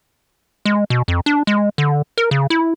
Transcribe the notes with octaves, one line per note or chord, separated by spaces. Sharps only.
G#3
B2
F2
D4
G#3
D3
A#4
C#3
E4